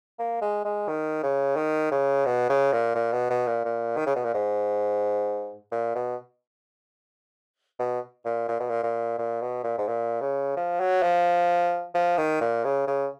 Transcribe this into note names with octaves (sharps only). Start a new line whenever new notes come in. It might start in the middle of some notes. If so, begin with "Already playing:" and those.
A#3
G#3
G#3
D#3
C#3
D#3
C#3
B2
C#3
A#2
A#2
B2
B2
A#2
A#2
D#3
C#3
B2
A#2
G#2
A#2
B2
B2
A#2
A#2
B2
A#2
A#2
A#2
B2
A#2
G#2
A#2
C#3
F3
F#3
F3
F3
D#3
A#2
C#3
C#3